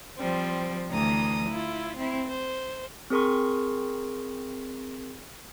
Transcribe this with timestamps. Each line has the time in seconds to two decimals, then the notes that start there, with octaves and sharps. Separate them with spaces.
0.17 F3 G3 C4
0.89 D2 E3 A#5 D#6
1.49 E4 F4
1.97 C4 E4
2.26 C5
3.10 C4 G#4 A#4 C6 C#6